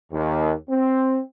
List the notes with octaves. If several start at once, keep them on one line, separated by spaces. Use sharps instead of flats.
D#2
C4